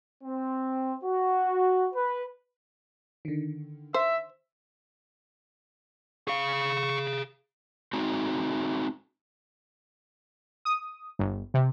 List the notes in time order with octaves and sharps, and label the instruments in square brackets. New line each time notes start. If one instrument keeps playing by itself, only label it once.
[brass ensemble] C4
F#4
B4
[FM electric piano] D3 D#3
[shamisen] C5 [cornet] E5
[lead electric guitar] G#4 F5 [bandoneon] C#6
[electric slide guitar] A3 C4 D#4 F#4
[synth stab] D#6
G1
C3